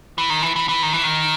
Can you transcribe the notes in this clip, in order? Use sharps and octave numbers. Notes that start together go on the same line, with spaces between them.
E3
D#3
E3
E3
E3
D#3
E3
D#3